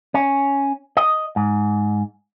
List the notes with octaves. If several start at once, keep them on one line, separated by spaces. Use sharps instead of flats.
C#4
D#5
G#2